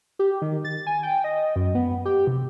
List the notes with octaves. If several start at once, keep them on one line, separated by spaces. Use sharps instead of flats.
G4
D#3
A6
G#5
G5
D#5
F#2
B3
G4
C3